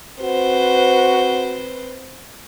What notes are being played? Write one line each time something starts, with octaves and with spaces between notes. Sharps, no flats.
C4 F#4 B4 C5